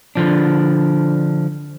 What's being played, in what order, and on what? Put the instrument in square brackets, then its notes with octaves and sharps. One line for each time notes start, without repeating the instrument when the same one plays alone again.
[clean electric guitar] D3 F3 D4